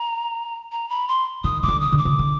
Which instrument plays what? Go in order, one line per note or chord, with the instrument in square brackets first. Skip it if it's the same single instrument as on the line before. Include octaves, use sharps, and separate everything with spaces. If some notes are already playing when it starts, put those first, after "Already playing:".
Already playing: [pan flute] A#5
A#5
B5
C6
[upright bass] D#3 [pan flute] D#6
[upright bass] D#3 [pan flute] D6
[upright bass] D3
[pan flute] D#6
[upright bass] D3
[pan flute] D6
[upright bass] C#3
D3